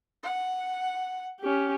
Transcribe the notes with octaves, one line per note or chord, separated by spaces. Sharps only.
F#5
C#4 G4